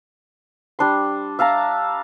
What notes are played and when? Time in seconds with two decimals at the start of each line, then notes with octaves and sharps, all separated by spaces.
0.79 G3 D4 C6
1.39 E5 F5 A5 A#5